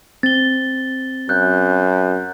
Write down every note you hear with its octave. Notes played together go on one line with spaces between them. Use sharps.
C4 A6 G7
F#2 F#6 G6